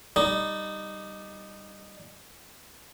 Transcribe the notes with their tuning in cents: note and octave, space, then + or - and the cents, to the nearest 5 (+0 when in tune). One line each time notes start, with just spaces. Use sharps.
G3 +0 D#4 -10